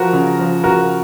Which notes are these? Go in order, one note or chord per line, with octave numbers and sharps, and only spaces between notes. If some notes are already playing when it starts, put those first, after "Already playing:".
Already playing: F3 F#4 A#4
C#3
F3
C#3 F#4 A#4